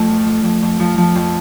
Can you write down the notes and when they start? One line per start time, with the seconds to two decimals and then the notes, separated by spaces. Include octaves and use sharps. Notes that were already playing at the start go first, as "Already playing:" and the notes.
Already playing: F2 A3
0.09 F3
0.27 F3
0.44 F2
0.62 F2
0.80 F3
0.98 F3
1.15 F2